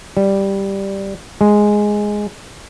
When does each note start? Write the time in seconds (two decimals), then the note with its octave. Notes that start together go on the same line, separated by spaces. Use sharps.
0.17 G3
1.41 G#3